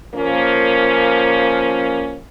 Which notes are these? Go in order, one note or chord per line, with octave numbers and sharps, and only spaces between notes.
F3 A#3 C#4